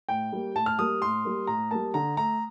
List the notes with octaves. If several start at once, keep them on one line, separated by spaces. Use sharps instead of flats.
A2 G5
G3 A#3
A2 A5
F6
G3 A#3 D#6
A2 C6
G3 A#3
A2 A#5
G3 A#3 A5
D3 A#5
A3 A#5